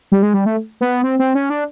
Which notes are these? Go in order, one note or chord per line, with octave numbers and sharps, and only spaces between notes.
G3
G#3
G3
A3
B3
C4
C4
C#4
D4